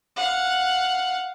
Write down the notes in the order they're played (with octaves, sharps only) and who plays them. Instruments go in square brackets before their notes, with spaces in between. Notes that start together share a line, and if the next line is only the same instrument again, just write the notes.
[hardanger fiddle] F5 F#5